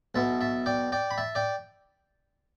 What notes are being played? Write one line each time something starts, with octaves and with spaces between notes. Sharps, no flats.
B1 B2 B3 E5 A5
E5 A5
D5 G5
D5 G5
B5
E5 A5
D5 G5